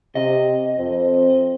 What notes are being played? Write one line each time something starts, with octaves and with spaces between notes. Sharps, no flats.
C3 D#5
F2 C4